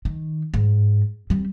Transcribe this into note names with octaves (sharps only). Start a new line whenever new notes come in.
D#3
G#2
G3 C4